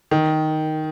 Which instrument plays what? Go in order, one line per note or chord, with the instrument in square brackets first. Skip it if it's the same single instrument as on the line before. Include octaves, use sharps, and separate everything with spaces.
[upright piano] D#3